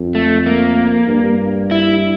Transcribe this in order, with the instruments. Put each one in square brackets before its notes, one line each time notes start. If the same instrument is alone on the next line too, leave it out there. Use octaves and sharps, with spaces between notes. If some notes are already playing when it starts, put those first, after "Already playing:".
Already playing: [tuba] F2
[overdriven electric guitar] A3
A#3
[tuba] G2
[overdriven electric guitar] E4